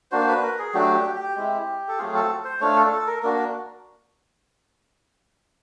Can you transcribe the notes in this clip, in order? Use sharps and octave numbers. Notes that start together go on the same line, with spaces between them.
A#3 D4 F#4 C5
B4
A#4
G#4
F#3 A3 D4 F#4 G4
G4
G4
G#3 C4 E4
A4
F#3 A3 C4 F4 G#4
A4
C5
A3 D4 F4 C#5
A4
A4
A#4
A#3 D4 F#4 A#4